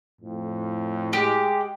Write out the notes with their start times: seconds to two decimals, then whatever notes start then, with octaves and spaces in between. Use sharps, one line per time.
0.21 F2 A2
1.13 G#3 G4